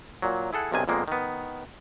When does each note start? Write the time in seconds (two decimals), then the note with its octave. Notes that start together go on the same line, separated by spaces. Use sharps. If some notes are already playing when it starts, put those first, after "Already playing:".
0.22 A#2 F#3
0.53 E4 G#4 A4 F#5
0.72 B1 C3 D#3 D4 G#5
0.88 F2 A#2 G#3 A#3 B3
1.08 D#3 B3